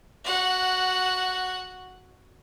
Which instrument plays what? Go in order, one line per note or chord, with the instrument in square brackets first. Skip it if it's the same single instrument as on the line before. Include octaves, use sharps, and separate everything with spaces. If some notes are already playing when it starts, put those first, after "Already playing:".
[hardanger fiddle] F#4 F#5